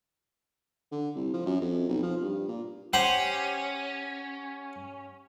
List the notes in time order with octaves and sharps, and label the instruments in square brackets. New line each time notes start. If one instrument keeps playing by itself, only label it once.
[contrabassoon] D3
C2
F3
F#2
F2
B1
F3
G2
A#2
[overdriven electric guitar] C#4 [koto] G4 C5 [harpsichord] F#5